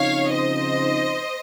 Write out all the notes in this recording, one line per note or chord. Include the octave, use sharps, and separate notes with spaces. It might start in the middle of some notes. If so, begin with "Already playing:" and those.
Already playing: C#3 F3 C4 D#4 C#5 F5
C5 D#5